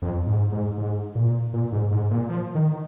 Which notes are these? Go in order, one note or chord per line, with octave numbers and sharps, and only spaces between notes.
F2
G#2
G#2
G#2
A#2
A#2
G#2
G#2
A#2
F3
D#3